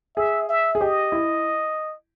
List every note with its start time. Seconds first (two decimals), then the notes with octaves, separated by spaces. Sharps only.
0.16 G#4 E5
0.49 E5
0.75 G#4
0.80 G4 D#5
1.12 E4